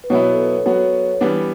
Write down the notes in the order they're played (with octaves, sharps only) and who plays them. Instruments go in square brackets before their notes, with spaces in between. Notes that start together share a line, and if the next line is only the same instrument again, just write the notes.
[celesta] B4
[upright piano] B2 F#3 B3 E4 [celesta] C#5
[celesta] A4
B4
[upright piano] F#3 B3 F#4 [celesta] C#5
[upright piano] E3 G3 B3 D4 [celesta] B4